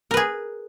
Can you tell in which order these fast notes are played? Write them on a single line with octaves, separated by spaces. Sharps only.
A#4 B4 G#4